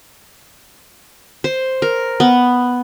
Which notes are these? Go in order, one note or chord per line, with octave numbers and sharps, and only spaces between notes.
C5
A#4
B3